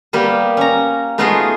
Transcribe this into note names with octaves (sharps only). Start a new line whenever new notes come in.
G3 A#3 B3 G4
C#4 A#5
A3 B3 D#4 F4 F#4 G#4